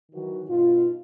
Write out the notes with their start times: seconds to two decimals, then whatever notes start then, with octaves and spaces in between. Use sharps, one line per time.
0.12 D#3 E3 F#3 F#4
0.47 G2 B2 D#4 F4